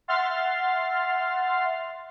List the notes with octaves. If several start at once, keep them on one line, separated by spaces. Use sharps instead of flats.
E5 F#5 C6 F6 A6 C7